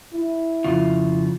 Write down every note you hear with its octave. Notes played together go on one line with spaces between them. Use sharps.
E4
F2 C#3 F4